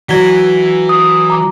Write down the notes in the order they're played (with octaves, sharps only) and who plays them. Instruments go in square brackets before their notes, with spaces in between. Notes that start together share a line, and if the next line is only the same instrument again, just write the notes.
[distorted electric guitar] E3 [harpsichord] F#3 [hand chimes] G#6 B6
[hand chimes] D#6
A#5 D6